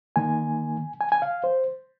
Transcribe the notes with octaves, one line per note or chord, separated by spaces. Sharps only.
D#3 A#3 G#5
G#5
G#5
F5
C5